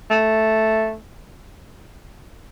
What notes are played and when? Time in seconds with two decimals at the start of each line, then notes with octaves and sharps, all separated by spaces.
0.11 A3